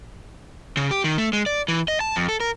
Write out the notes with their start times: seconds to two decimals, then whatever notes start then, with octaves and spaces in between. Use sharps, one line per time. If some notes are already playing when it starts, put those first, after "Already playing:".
0.77 C#3
0.91 G4
1.04 D#3
1.18 A3
1.33 G#3
1.46 D5
1.68 E3
1.88 D#5
2.00 A5
2.16 F2
2.29 A4
2.40 A#4